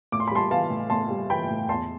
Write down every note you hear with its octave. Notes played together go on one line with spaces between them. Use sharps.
A2 D6
C6
B5
G3 A5 C6
E3 F5 A5
A2
A2 A5 C6
G3
E3 G5 B5
A2
E2 A5 C6